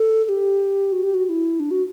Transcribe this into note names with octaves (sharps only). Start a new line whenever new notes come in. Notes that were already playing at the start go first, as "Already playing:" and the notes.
Already playing: A4
A4
G4
F#4
G4
F#4
F#4
E4
D4
F#4